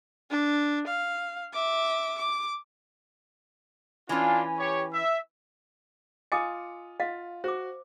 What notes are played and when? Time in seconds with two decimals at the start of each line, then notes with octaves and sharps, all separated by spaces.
0.31 D4
0.87 F5
1.53 E5 D6
2.18 D6
4.09 E3 C#4 D4 F4
4.58 G4 C#5
4.93 E5
6.32 F4 D#5 G#5 D6 D#6 C#7
7.00 F4 D#5 F5 F#5
7.44 F#4 C5 D6